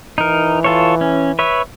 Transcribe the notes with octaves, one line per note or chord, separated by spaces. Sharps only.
E3 D#4 A#4
F4 A4 C#5
C#4
B4 C#5 E5